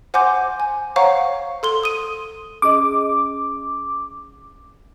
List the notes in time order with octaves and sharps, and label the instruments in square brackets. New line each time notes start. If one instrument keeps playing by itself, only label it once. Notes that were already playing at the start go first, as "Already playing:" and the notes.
[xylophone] C5 F#5 G#5 C6 D6 G6
G#5
C5 C#5 F5 F#5 A#5 C#6
A4 C6 G7
D#6 D#7
[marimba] C#4 G#4 D#5 [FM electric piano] D6